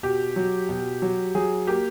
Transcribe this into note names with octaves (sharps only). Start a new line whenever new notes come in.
B2 G4
F#3
B2
F#3
F#3 G#4
A#3 G4